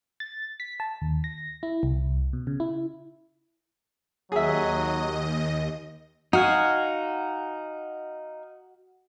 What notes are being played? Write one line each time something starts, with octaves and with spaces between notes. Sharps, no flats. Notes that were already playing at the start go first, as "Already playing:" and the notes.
A6
B6
A5
D#2
A#6
E4
C2
B2
C#3
E4
D#2 F#3 G#4 D#5 E5
D#4 F#4 F5 G#5